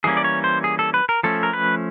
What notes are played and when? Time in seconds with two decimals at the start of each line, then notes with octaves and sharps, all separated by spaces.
0.04 E3 G3 A#3 C#4 G#4
0.17 D5
0.24 C#5
0.44 C5
0.64 G#4
0.79 A4
0.94 B4
1.09 A#4
1.23 F3 A3 C#4 A4
1.43 A#4
1.53 B4